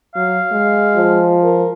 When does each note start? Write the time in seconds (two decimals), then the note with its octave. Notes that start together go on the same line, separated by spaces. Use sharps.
0.15 F#3 F5
0.52 G#3
0.97 F3
1.43 A#4